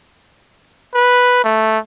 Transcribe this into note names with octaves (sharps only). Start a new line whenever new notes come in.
B4
A3